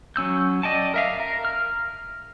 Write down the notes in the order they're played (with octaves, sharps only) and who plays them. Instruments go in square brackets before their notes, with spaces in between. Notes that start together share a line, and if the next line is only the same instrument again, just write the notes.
[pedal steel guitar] F#3 C#4 E6 G6
D5 D#5 G5 A5
A#4 E5 F5
A#4
F6